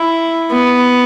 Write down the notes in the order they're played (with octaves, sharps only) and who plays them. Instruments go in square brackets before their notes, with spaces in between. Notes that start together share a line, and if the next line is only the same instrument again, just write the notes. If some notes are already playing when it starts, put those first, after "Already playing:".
Already playing: [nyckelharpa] E4
B3